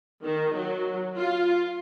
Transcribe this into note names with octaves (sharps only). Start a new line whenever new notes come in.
D#3
F#3
F4